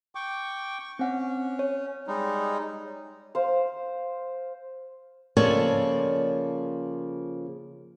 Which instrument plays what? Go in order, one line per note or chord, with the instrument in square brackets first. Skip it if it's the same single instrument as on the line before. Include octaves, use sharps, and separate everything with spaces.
[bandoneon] G5 C#6 D6
C#6
[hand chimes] C4 F#5 [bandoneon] C#4
[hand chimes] C#5
[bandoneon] G3 G#3 D#4
[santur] C5 F5
[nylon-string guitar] C#3 F3 A#3 A4 C#5 D5